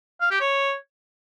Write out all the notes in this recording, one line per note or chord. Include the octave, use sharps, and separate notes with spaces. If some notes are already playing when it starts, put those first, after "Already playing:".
F5
G4
C#5